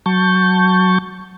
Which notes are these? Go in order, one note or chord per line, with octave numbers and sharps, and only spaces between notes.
F#3 A5 C#6 G6